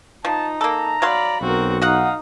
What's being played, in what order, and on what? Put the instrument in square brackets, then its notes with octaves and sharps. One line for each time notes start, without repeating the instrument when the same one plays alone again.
[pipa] F3 [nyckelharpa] D#4 [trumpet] A5
[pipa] A#3 A4 [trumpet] A#5
[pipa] F#3 F5 C6 [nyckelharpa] D5 B5
[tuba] B1 [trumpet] C4 [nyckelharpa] F#4 A#4
[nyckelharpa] D#4 D#6 [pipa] F#4 F#5 [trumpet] F5